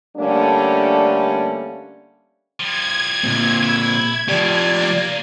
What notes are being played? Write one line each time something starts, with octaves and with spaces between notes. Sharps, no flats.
D3 G3 A3 A#3 C#4 D4
F3 G3 G#6
A#2 C4
E4
A2 F3 G4 D5
C#2 A#3